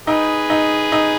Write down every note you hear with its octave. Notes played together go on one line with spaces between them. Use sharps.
D#4 G#4 B4
D#4
D#4